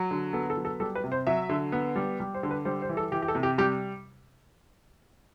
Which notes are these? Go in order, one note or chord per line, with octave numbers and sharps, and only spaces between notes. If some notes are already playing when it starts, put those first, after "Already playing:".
Already playing: F#3
D3
B3 A4
A4
F#3
A4
G3 A4
B4
C3
C5
F#3 E5
D3
B3
G3
G3
C5
D3
B4
G3 C5
C5
E3
A4
E3 G4
G4
A4
C3
G4
G3 G4